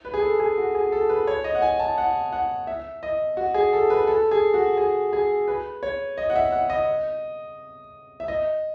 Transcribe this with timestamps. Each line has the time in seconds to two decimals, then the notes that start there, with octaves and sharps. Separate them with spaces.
0.05 B4
0.14 G#4
0.22 A4
0.40 G#4
0.58 F#4
0.75 G#4
0.92 A4
1.09 B4
1.27 C#5
1.44 D#5
1.55 F#5
1.62 G#5
1.80 A5
1.98 F#5
2.33 F#5
2.67 E5
3.03 D#5
3.37 F#4
3.54 G#4
3.73 A4
3.90 B4
4.07 A4
4.31 G#4
4.54 F#4
4.78 G#4
5.13 G#4
5.48 B4
5.83 C#5
6.18 D#5
6.30 F#5
6.36 E5
6.52 F#5
6.70 D#5
8.20 E5
8.28 D#5